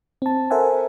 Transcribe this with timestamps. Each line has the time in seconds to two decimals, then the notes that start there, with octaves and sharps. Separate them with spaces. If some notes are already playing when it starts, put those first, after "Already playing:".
0.22 C4 A5
0.50 A4 A#4 C5 E5 F#5 G#5